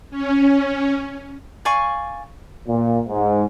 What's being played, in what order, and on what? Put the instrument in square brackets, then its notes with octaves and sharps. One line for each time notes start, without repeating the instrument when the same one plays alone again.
[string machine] C#4
[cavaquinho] D5 F5 G#5 C#6
[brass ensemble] A#2
G#2